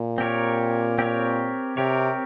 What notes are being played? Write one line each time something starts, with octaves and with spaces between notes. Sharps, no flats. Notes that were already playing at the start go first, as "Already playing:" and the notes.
Already playing: A#2
C4 G4 A#4 C#5
C4 G4 A#4 C#5
C3 C4 G4 A#4 C#5